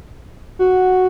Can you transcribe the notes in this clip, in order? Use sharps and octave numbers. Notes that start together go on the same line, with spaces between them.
F#4